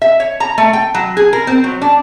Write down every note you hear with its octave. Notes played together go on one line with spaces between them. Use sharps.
E5
C#5
A#5
A3
G5
F#3
G#4
A#4
C4
F#3
D4